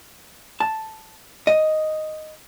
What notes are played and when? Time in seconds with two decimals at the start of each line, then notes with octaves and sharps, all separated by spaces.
0.60 A5
1.47 D#5